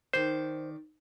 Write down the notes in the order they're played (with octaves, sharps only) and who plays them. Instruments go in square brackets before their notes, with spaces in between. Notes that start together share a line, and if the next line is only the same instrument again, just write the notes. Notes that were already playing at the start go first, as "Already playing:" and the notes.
[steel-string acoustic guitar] D#3 D5 [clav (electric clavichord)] C5